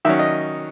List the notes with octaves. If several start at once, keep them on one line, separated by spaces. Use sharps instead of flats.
D#3 F#3 C#4 E5
D#5